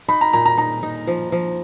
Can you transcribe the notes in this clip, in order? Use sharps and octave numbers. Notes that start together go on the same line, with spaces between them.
D#4 B5
A#5
A#2 A#5
A#5
D#4 A#5
D#4
F3
F3